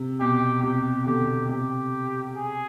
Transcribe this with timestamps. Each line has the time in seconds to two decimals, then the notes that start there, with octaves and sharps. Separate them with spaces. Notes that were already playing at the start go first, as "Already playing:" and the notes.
Already playing: C3
0.20 B2 G4
0.63 C3 G4
1.06 B2 D3 G4
1.49 C3 G4
2.36 G#4